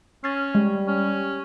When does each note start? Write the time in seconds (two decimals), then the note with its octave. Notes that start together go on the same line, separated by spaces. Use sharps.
0.24 C#4 A6 C7
0.55 G3 G#3
0.88 C#4